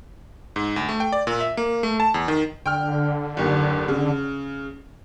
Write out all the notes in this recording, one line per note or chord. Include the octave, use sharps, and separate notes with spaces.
G#2
D2
A3
G5
D5
A#2
E5
A#3
A3
A5
E2
D#3
D3 G5 F6
F#1 D#2
C#3